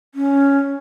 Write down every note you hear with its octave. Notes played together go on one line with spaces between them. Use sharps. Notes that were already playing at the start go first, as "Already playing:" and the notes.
C#4